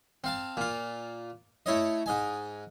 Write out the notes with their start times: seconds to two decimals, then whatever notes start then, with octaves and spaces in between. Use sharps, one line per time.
0.24 C4 F5 A5
0.57 A#2 F4
1.66 A3 E4 C#5 D#5
2.06 G#2 D#5 G#5